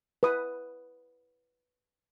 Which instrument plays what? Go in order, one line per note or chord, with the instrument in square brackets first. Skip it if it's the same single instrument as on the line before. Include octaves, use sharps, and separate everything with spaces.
[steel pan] B4 D#6